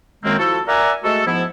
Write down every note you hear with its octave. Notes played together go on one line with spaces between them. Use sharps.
F#2 D#3 G#3 A#3 C4
F3 E4 F#4 A4
A#4 D5 E5 F#5 G#5 A#5
G#3 A3 F#4 A4
G#2 F3 B3 E4